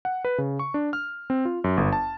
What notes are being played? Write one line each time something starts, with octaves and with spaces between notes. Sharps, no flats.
F#5
B4
C#3
C#6
D4
F6
C4
F4
F#2
G1
A5